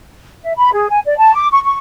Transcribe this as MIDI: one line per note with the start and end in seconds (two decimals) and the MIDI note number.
0.43 0.53 76
0.57 0.72 83
0.73 0.88 68
0.89 0.99 80
1.06 1.17 74
1.18 1.32 81
1.34 1.47 86
1.52 1.60 85
1.64 1.78 85